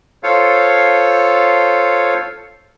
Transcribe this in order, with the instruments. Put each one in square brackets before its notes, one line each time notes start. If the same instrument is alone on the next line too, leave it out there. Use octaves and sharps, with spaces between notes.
[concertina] F4 A4 C5 C#5 F5